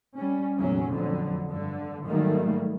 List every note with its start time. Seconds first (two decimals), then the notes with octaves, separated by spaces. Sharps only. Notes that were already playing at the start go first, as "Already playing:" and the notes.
0.17 G3 C#4
0.59 F1 A#1 E2 F#3 C#4
0.92 F2 D3 F#3
1.49 G2 D3
2.06 G#2 D#3 F#3 G3 A3 A#3